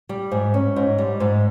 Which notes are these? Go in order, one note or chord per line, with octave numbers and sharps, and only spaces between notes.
G3
G#2
C#4
G#2
G3
G#2